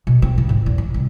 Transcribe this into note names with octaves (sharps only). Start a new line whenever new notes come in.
B2
C4
C#3
G#2
E2
D#3
C2